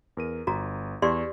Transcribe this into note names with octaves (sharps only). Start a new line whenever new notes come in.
E2 A#4 D#7
G1 F#4 A#5
E2 G4 D5 C6